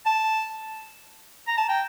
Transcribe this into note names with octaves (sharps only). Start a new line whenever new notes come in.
A5
A#5
A5
G5